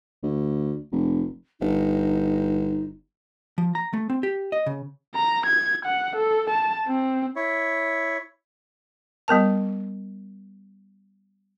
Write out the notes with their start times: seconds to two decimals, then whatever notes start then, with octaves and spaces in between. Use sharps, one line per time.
0.23 D2
0.92 F1
1.61 G1 D#4
3.58 F3
3.75 A#5
3.93 A3
4.10 C4
4.23 G4
4.52 D#5
4.66 C#3
5.15 A#5
5.46 G#6
5.86 F#5
6.16 A4
6.50 A5
6.88 C4
7.36 E4 C#5
9.28 G3 B3 A#4 A5